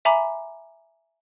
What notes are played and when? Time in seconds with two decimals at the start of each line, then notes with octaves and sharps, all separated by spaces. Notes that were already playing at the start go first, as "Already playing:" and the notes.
0.05 E5 G#5 A#5 B5 D6